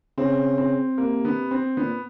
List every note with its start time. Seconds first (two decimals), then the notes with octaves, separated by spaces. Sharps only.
0.18 C#3 C4
0.58 C4
0.98 C3 A#3
1.25 B3
1.51 C4
1.77 A#2 B3